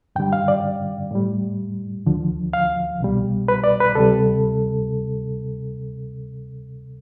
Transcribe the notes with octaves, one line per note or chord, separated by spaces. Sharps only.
G2 D3 G3 G5
F5
D5
A2 G3
D2 D3 F3
F5
C2 B2 G3
B4
D5
B4
D2 C3 G3 A4